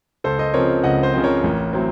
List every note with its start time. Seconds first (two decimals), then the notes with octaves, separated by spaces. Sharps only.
0.24 C#2 A4 C5
0.39 C5 D#5
0.54 C#3 F3 C4 A#4 C#5
0.84 C#2 D#5 F#5
1.03 C5 D#5
1.14 C#3 F3 C4
1.24 A#4 C#5
1.44 A1
1.73 A2 F#3 C4